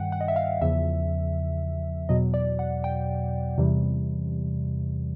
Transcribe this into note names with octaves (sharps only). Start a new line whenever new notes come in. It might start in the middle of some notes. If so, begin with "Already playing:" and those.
Already playing: G2 D#3 G3 F#5 G5
F#5
D#5
E5
F5
E2 C#3 F3 E5
E2 B2 F#3 D#5
D5
F#5
G5
E2 C3 E3 G3